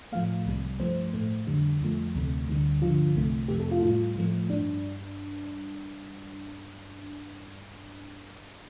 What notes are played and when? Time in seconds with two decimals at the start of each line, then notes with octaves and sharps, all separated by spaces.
0.12 A2 F3 A3 F5
0.46 C2 C3 G3
0.80 G2 F3 A3 C5
1.13 A2 A3
1.47 F2 D3 G3
1.80 F2 F3 A3
2.14 D2 C3 A3
2.48 D2 D3 G3
2.82 G2 D3 F3 F4
3.15 C2 C3 A3
3.48 F2 C3 A3 G4
3.60 A4
3.71 F4
3.83 A2 G3 F4
4.16 A2 F3 A3
4.50 G2 G3 D4